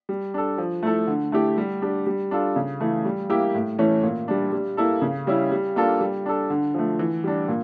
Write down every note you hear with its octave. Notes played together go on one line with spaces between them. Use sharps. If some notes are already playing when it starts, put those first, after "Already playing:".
G3
D4 A4
F3
A3 E4 A4
D3
A3 E4 G4
G3
D4 G4
G3
D4 F4 A4
C#3
E3 A3
G3
A#3 E4 G4
A2
E3 A3 C#4
A#2
G3 D4
G3
A#3 E4 A4
C#3
G3 C#4 E4
G3
A#3 D4 F4 A4
G3
D4 A4
D3
F3 A3
E3
G3 D4
A#2